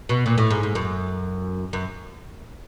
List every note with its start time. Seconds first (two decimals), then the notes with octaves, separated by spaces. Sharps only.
0.09 B2
0.26 A#2
0.38 A2
0.50 G#2
0.63 G#2
0.75 F#2
1.73 F#2